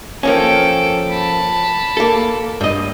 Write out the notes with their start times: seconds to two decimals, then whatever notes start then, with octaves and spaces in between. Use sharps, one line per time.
0.23 F3 A#3 C#4 A4 G5
1.09 A5 B5
1.97 A#3 A4
2.61 G2 D#5